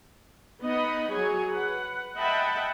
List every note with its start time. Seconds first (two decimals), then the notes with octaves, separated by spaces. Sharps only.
0.62 B3 D#4 D#5 F#5 B5
1.12 F#3 G#4 C#5 G#5
1.50 B4 F#5
2.16 D#5 E5 F#5 G5 A5 B5